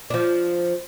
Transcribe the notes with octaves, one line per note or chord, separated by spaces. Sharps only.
F3 D4